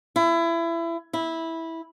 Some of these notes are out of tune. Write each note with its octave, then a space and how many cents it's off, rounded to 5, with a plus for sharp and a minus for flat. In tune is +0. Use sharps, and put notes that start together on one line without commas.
E4 +25
E4 -10